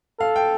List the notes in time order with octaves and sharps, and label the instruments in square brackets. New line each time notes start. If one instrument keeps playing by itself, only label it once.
[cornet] A4 [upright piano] F5
[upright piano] G5